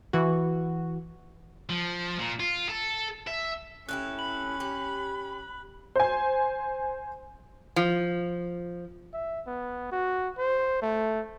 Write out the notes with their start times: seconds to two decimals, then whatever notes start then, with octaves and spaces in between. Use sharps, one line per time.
0.13 E3 F#4
1.69 F3
2.19 A#2
2.40 F4
2.69 A4
3.27 E5
3.89 A2 C#4 E4 G4 F#6
4.19 B5 F#7
4.60 G4
5.96 C5 G#5
7.76 F3
9.13 E5
9.47 B3
9.92 F#4
10.38 C5
10.82 A3